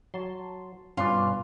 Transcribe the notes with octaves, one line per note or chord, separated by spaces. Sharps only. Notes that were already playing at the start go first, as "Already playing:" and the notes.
F#3 A5 C6
G2 B2 C#4 F4 B4 D5